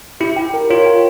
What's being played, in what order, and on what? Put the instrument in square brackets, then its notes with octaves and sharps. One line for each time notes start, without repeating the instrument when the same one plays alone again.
[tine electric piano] E4 [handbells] G4
[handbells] G5
A#4
[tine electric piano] F4 [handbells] C#5
[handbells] G5